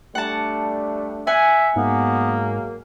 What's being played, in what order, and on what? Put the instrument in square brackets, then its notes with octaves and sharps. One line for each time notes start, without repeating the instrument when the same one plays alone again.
[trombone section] G3 A3 D4 [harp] F#5 A5
[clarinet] E5 [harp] F#5 G#5
[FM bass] G#2 [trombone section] F#3 G#3 A#3 [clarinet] B3